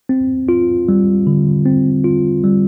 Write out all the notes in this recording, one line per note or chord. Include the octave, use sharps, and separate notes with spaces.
C4
F4
G3
D3
C4
F4
G3